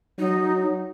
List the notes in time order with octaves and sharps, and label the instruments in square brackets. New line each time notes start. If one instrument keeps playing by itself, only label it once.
[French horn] F#3 [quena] D#4